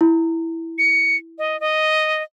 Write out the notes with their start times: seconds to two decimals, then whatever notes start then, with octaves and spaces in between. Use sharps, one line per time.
0.01 E4
0.78 C#7
1.38 D#5
1.60 D#5